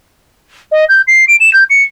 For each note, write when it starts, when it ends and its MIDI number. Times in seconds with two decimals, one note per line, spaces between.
0.71 0.85 75
0.89 1.01 91
1.07 1.25 96
1.28 1.36 98
1.40 1.53 100
1.53 1.63 91
1.70 1.82 97